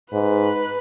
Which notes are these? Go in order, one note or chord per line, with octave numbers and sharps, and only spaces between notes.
G#2 B4